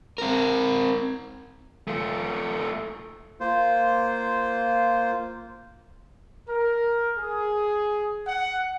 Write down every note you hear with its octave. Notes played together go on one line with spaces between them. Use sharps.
C4 A#4
A3 F4
A#3 F4 C5
A#4
G#4
F#5